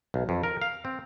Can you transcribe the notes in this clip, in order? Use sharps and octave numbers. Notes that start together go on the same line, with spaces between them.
B1
F2
A#4
F5
C4